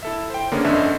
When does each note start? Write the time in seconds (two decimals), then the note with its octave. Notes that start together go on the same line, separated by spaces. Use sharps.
0.03 E4 A4 E5
0.30 C5 G5
0.52 D3 A#3 B3 C#4 G#4
0.64 G1 F2 D3 C#4 D#5 E5